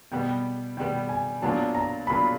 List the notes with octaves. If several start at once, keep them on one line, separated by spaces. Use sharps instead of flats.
B2 G3 B3 G5
B2 G3 B3 G5
G#5
A#2 F#3 B3 D4 F4 A5
A#5
A#2 F#3 B3 D4 F4 B5